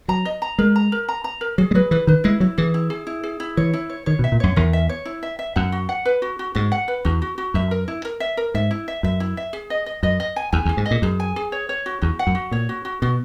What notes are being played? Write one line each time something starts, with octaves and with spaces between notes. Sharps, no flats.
F#3 A#5
D#5
A#5
G#3 A#4
A#5
A#4
A#5
A#5
A#4
F#3 G#4
G#3
F#3 B4
E3 B4
D#3 B4
G#3 E4
F#3 E4
E3 G#4
E4
G#4
E4
G#4
E4
E3 C#5
E4
C#5
D#3 C#5
B2
E5
A#2
F#2 C#5
E2 A#4
E5
C#5
E4
E5
E5
F#2 F#5
F#4
F#5
B4
F#4
F#4
G#2 F#4
F#5
B4
E2 F#4
F#4
F#4
F#2 E5
A#4
E4
A#4
E5
A#4
G#2 E5
E4
E5
F#2 E5
E4
E5
G#4
D#5
D#5
F#2 D#5
D#5
G#5
E2 G#5
E2
G#4
G#2
D#5
A#2
F#2 G#4
G#5
G#4
C#5
C#5
F#4
E2 F#4
F#5
F#2
F#4
A#2 C#5
F#4
F#4
B2 F#4